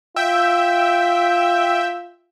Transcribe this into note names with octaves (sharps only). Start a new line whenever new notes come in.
F4 E5 G5